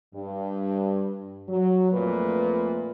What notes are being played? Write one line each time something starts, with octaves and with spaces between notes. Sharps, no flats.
G2
F#3
F2 A#2 A3 B4